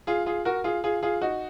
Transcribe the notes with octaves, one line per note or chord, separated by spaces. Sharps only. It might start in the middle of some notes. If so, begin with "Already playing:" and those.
F4 G#4
F4 G#4
F#4 A#4
F4 G#4
F4 G#4
F4 G#4
D#4 F#4